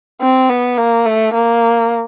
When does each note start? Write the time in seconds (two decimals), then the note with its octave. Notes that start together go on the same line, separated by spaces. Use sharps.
0.21 C4
0.49 B3
0.78 A#3
1.06 A3
1.34 A#3